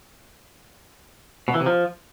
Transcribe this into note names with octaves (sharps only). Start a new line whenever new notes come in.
B2
E3
C3
F3